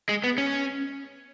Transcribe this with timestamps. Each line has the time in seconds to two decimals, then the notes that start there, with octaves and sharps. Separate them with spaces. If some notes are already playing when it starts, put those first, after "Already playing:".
0.09 G#3
0.24 B3
0.38 C#4